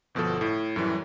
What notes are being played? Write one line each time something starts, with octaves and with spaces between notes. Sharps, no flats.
G1 B2 F3 A4
A2
F#2 A2 E3 G3